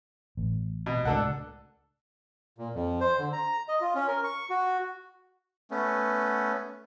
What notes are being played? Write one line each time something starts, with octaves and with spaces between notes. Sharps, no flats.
A1
B2
C#2 A2 D4 A4 F#5
A#2
F2
C5
D3
A#5
D#5
F4
C#4
A#4
C#6
F#4
A3 B3 C#4